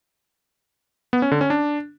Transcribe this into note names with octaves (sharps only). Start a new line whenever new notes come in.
B3
C#4
D3
C#4
D4